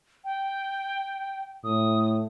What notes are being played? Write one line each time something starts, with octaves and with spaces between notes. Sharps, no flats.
G5
A2 D#6